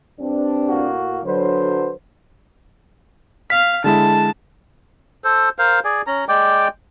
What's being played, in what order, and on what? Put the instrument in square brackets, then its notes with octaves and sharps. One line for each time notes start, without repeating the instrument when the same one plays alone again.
[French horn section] G2 C4 D4
[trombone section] A2 A#3 F#4
[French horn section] D3 F#3 [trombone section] B4 C5
[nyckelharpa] F5 [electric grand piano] B6
[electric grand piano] D3 G#3 E4 [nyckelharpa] A5
[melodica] A4 C5
A#4 C5 F5
G#4 D5 G#5
C#4 A#5
G#3 D5 G5 D6